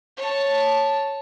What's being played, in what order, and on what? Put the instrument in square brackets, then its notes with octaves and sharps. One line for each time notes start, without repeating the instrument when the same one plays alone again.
[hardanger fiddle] C#5 A5